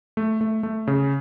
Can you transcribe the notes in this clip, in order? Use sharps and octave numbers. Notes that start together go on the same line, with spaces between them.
A3
A3
A3
C#3